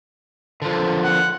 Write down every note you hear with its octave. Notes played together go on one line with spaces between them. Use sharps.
D3 F3
F#5